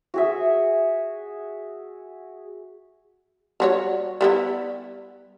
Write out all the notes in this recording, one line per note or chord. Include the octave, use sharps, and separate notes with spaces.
F#4 G#4 E5
G3 F#4 C#5
G3 B3 E4